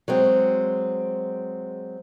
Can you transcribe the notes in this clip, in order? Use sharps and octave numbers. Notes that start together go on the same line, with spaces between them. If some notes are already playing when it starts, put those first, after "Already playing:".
F#3 G#3 C4